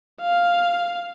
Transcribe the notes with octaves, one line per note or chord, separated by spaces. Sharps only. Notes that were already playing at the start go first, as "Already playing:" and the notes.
F5